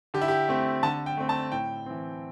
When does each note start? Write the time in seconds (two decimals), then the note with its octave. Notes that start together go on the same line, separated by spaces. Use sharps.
0.14 D3 G4
0.21 E4
0.28 G4
0.49 A3 C4
0.83 D3 A5
1.06 G5
1.17 A3 C4
1.29 A5
1.52 A2 G5
1.86 E3 C4